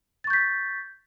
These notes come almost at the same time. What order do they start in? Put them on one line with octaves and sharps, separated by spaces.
A6 C#6 G6 B6